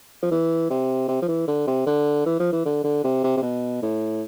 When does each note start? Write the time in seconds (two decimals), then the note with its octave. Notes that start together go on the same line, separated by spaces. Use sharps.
0.23 F3
0.32 E3
0.70 C3
1.08 C3
1.22 F3
1.29 E3
1.48 D3
1.67 C3
1.87 D3
2.26 E3
2.40 F3
2.53 E3
2.66 D3
2.84 D3
3.04 C3
3.24 C3
3.37 C3
3.43 B2
3.82 A2